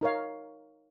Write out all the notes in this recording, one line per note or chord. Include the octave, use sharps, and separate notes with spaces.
D#4 A#4 C#5 F5